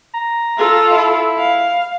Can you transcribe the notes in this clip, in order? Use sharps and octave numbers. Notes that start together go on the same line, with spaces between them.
A#5
F4 A4
E4
F5